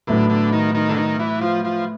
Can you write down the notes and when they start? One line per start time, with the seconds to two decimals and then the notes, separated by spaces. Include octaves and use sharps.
0.07 A2 D3 F#3 B3
0.30 D3
0.52 D#3
0.75 D#3
0.89 D3
0.96 D#3
1.19 E3
1.41 F3
1.64 F3